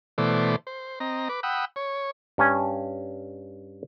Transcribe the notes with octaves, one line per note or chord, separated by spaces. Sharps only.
B2 E3 A3 C5 D5
C5
C4 D#5 A#5
B4 D6
F#5 G5 B5 D#6 E6
C#5
G2 C#4 G#5